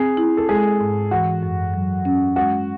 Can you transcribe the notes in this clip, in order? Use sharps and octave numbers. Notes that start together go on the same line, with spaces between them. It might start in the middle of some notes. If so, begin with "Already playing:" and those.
Already playing: C4 G#4
E4
A4
G#3 G#4
G#2
E3 F#4
F#2
F#3
C#4
G#3 F#4